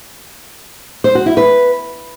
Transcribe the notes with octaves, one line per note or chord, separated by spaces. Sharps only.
C5
F#4
E4
B4